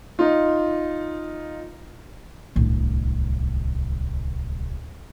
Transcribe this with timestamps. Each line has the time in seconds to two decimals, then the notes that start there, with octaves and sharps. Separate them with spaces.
0.19 D#4 F4
2.56 D1 C2